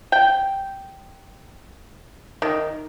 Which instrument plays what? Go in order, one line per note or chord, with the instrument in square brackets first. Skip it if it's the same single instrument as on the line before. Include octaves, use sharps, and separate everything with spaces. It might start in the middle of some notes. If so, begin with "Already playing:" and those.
[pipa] G5
D#3